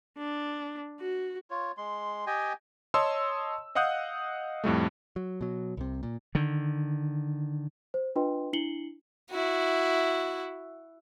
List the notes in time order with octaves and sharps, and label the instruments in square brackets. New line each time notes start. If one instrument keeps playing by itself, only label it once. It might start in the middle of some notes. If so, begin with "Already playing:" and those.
[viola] D4
F#4
[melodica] F4 C#5
G#3 C6
G4 D#5 G5 G#5
[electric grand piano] C#5 D#5 A5 C6 D#6 E6
D#5 F5 F#5 D#6 F#6 G6
F2 A2 G3 A3
[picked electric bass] F#3
B2 F#3
C2 C3
A#2
[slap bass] D3 D#3
[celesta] C5
D4 F4 B4 D#5 G5 C6
D4 E4 C7 C#7 F#7 G7
[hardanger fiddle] E4 F#4